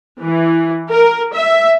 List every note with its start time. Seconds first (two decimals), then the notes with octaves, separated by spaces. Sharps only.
0.21 E3
0.90 A#4
1.33 E5